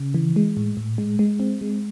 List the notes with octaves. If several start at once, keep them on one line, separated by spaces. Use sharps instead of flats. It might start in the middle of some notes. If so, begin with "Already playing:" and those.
Already playing: C#3
E3
G#3
A2
A2
G#3
G#3
C4
G#3